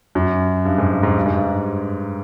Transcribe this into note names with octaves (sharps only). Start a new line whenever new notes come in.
F#2
G2
G#2
G2
G#2
G2
G#2
G2